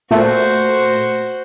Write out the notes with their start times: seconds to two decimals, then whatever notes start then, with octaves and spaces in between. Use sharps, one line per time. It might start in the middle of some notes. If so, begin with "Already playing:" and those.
0.11 A#2 A3 F#4 C5